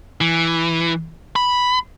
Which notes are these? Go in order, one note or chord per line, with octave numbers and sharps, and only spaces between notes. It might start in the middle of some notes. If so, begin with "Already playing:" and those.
E3
B5